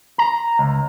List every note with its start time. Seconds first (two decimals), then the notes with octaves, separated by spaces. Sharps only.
0.18 A#5
0.59 C#2